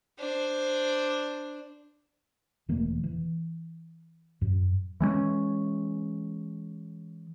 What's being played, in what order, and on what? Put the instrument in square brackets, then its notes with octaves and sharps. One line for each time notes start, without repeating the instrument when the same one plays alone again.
[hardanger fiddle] D4 C5
[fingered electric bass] E1 E3 A3 A#3
E3
F#2
[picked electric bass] E3 G#3 A#3 C#4